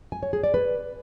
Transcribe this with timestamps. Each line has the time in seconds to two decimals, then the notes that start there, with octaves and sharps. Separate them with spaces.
0.12 G#5
0.23 C#5
0.33 G#4
0.44 D5
0.54 B4